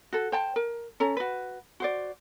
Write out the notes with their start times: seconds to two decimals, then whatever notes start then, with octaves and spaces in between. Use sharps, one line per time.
0.13 F#4 A4
0.32 C5 G5 A5
0.56 A#4
1.00 C#4 A4 A#5
1.17 F#4 B4
1.80 F#4 C5 D5